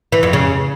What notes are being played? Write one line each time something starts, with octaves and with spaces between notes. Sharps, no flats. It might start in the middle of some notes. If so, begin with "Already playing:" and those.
E3
F2
C#3